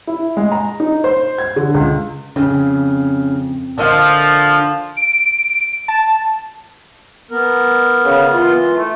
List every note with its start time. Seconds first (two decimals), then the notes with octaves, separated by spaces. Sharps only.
0.07 E4
0.37 G#3
0.52 A#5
0.80 D#4
1.04 C5
1.38 G#6
1.56 D3
1.74 C#2
2.36 F2 C#3
3.78 D3 F3 A#4 D#5 F5
4.97 D7
5.88 A5
7.31 B3 A#4
8.05 C#3
8.32 E3 F4
8.76 A3